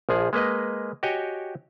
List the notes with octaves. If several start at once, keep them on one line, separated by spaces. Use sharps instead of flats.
A#1 F3 G#4
G#3 A#3 B4 D#5
F#4 G4 C#5 D#5 G5 G#5